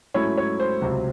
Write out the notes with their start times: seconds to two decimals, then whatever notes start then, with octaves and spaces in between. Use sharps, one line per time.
0.14 G#2 F#3 A3 C#4 E4 C#5
0.37 C#5
0.60 C5
0.82 C#2 C3 F#3 C4